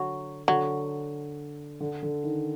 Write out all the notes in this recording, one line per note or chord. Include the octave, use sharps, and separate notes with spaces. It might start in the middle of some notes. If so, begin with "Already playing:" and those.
Already playing: D3 F#3
D3 F#3
D3
D3
D#3